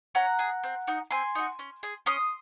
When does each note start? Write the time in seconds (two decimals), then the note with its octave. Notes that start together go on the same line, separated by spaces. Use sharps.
0.15 C#4 F#5 A#5
0.39 G#4
0.64 C4
0.87 D#4 F#4
1.11 C4 G#5 C6
1.35 D#4 F#4
1.59 C#4
1.83 G#4
2.06 C#4 C6 D#6